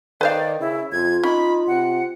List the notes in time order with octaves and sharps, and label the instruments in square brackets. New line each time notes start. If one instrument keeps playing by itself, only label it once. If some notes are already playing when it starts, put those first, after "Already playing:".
[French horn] D#3 [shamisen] B4 C5 F5 [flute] D5
[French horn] C#3 [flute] E4
[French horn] F2 [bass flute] F4 [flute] G#6
[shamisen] C#4 [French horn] D#4 [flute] B5
[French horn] C3 [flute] F#5